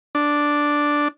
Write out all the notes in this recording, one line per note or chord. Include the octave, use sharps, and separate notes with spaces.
D4